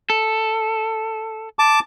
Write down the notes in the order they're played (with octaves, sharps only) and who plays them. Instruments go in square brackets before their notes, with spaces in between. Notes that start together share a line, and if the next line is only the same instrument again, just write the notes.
[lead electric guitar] A4
[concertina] A5 D6